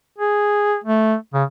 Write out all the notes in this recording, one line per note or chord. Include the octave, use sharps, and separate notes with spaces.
G#4
A3
C#3